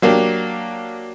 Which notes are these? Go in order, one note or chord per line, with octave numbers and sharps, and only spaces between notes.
F#3 A#3 D4 G4